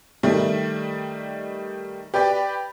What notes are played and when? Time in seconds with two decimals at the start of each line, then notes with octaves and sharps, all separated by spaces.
0.23 D#3 G3 A3
2.14 G4 B4 D5 G5